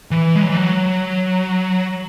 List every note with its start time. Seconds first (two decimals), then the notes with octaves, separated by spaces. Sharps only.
0.11 E3
0.35 G#3
0.43 F#3
0.49 E3
0.56 F#3